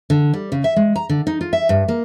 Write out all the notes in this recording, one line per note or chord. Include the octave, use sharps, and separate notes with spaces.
D3
G3
C#3
E5
G#3
A#5
D3
D#4
F4
E5
G2
A#3